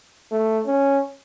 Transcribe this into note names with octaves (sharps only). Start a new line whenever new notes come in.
A3
C#4